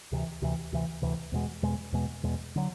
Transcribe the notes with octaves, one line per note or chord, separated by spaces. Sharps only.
D2 C3 E3
D2 C3 E3
D2 C3 E3
D2 C3 E3
E2 B2 G#3
E2 B2 G#3
E2 B2 G#3
E2 B2 G#3
D3 F#3